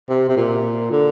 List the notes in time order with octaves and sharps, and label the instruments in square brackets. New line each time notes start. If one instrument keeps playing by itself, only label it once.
[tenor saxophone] C3
C3
A#2
D3